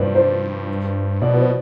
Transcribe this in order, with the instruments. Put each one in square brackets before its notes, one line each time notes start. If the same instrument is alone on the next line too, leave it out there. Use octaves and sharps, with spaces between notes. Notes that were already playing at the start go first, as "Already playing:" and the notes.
Already playing: [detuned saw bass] G2 [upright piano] B4 C5 D5
[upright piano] C5
[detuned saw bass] B2 [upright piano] D5
[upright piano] B4
C5